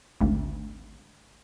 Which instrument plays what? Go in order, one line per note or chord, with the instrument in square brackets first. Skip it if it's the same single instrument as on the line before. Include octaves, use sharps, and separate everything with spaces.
[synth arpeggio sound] G#1 D2